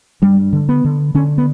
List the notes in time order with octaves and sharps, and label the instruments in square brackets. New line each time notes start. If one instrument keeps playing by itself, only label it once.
[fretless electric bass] G2 G3
D3
B3
D3
D3 C#4
B3